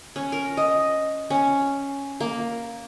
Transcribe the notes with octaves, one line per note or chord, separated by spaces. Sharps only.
C#4
A#4
D#5
C#4
A#3